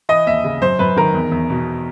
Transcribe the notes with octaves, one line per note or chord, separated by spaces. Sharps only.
E3 D#5
D#2 E5
C#3
F#2 C5
F#2 B4
D#3 A#4
E2
E2
B2